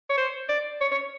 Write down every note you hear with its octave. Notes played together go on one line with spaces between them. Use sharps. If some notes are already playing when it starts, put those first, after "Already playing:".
C#5
C5
D5
C#5
C#5